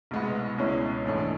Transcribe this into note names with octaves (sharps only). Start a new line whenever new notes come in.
C2 B2 G#3 B3
C#2 B2 G#3 C#4 E4
A#1 G#2 E3 A3 C#4